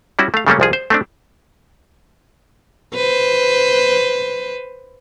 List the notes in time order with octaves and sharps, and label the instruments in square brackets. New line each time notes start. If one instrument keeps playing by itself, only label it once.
[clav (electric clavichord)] G3 C#4 E4 F#4
A3 F5
C#3 G3 A3 A#3 C#4
C2 F3 G#4
C5
A3 C4 D4
[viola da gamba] B4 C5